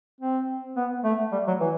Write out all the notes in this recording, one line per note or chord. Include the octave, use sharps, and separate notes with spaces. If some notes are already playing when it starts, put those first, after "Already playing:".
C4
B3
A3
G3
F#3
E3